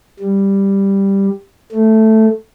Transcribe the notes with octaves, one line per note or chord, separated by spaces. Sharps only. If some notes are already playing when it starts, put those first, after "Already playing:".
G3
A3